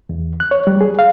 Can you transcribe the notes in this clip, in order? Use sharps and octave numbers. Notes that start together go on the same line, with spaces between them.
E2
F#6
C#5
G3
G#4
F5